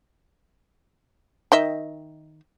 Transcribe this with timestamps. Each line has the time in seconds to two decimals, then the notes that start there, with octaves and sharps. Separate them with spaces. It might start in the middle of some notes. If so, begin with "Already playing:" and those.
1.52 D#3 D#5 E5